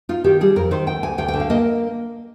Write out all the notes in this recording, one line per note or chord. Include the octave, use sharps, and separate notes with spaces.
D#4 F4
D#3 G4
G3 G#4
F2 A#4
D#3 C5
D2 G5
D2 G#5
D2 G5
G5
D3
F5
A#3 D#5